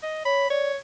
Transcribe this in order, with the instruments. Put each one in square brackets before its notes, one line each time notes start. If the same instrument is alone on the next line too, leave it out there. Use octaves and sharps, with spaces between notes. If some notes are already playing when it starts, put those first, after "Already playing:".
[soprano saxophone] D#5
[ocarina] C#5 [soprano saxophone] B5
[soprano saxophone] C#5 [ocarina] D5